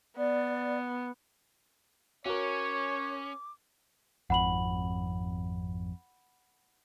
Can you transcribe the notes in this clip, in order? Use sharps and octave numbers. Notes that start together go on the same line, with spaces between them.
B3 D5
C#4 F#4 A#4 C#5 D6
G#1 F2 F#5 B5 F#7